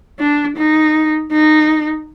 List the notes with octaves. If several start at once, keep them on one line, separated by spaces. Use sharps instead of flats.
D4
D#4
D#4